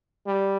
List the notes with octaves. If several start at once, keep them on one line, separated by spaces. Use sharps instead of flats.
G3